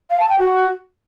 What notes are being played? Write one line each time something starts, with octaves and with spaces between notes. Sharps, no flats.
F5
A5
G5
F#4